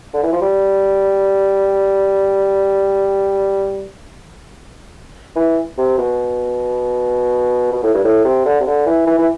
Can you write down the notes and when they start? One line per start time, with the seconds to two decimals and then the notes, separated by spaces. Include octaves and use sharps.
0.13 D3
0.23 E3
0.32 F3
0.41 G3
5.36 E3
5.78 C3
5.98 B2
7.72 B2
7.83 A2
7.94 G2
8.04 A2
8.25 C3
8.45 D3
8.60 C3
8.66 D3
8.86 E3
9.07 E3
9.18 E3